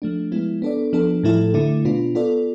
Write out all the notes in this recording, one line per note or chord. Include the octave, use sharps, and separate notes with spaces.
F3 A3 D4
F3 G#3 B3 E4
B3 D4 A4 D5
F3 B3 D4 A4
A2 F3 A3 E4 A4
D3 A3 E4
B2 B3 D4 F4
B3 F4 A4 D5